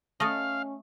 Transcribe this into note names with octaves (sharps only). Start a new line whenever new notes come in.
A3 C#4 A4 D#5 F5